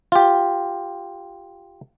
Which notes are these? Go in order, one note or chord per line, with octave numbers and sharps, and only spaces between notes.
F4 G4